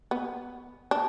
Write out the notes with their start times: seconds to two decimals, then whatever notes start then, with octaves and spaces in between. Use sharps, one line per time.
0.11 B3
0.91 D4